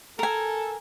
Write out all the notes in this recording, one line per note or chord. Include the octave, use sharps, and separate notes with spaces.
A4 A#4 G#5